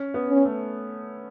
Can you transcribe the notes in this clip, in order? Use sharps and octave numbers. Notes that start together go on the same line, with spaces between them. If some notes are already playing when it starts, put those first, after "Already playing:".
Already playing: C#4
B3
C#4
A3